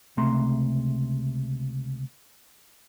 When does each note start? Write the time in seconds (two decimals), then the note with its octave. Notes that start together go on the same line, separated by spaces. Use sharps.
0.17 C#2 C3 A3 A#5 C6